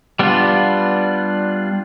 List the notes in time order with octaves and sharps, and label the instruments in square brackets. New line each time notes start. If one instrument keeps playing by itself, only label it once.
[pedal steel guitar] G3 B3 D4 F4